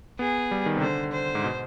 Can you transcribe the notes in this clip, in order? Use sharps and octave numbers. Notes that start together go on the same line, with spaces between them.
B3 G#4
G3
D#3
C3
D3 C5
C5
G#2
B2